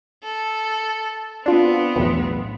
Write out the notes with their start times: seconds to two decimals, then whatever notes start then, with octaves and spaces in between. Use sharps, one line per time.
0.25 A4
1.46 B3 C4 D4 F4
1.96 B1 E2 A2